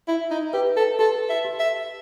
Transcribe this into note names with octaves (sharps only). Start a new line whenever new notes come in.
E4 E5
D#4
G4 B4
A4
G4 A4
E5
G4
E5